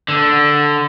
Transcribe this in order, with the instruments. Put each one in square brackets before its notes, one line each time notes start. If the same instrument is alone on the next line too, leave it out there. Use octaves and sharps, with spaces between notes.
[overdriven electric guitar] D3